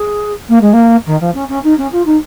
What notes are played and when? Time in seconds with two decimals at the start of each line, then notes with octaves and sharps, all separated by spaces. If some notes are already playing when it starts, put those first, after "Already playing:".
Already playing: G#4
0.49 A#3
0.61 G#3
0.73 A#3
1.06 D#3
1.20 F3
1.34 C#4
1.49 C#4
1.63 D#4
1.77 C#4
1.92 F4
2.05 D#4